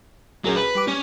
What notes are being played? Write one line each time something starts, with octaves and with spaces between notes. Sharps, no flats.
A#1 F#3 C#4 G#4 A#4
B4
G3 G4 D6
C#4